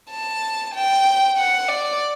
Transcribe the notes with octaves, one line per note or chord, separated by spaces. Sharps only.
A5
G5
F#5
D5